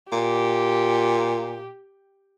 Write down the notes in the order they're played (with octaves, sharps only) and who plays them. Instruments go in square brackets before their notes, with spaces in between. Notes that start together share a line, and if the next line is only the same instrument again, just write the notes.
[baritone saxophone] A#2 [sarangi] G4